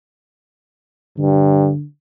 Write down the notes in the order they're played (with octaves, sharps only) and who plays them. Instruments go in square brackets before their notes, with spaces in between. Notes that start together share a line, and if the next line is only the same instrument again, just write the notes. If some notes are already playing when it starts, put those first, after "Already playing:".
[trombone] G2 [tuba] D3